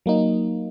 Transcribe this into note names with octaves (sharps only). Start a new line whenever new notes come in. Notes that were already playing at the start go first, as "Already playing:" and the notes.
F#3 A#3 D#4